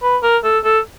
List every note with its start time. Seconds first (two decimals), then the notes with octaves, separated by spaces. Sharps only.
0.02 B4
0.23 A#4
0.44 A4
0.64 A4